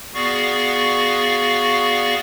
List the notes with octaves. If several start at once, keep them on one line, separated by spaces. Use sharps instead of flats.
B3 F#4 G#4 D5 F5 C#6